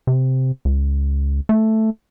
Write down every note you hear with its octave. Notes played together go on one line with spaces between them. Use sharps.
C3
C#2
A3